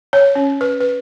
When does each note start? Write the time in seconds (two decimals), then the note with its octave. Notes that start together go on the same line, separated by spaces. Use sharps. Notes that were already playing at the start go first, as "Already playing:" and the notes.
0.13 C#5
0.35 C#4
0.61 B4
0.81 B4